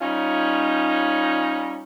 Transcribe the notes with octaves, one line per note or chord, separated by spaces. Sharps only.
G3 C#4 D#4 F4